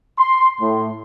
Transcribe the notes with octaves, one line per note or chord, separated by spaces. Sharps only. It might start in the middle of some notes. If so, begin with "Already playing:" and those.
C6
A2